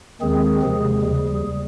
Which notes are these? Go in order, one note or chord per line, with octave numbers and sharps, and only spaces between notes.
D#2 D#3 G#3 C4 G#4
C3 F3 G#3 G#4
D#2 C#3 G3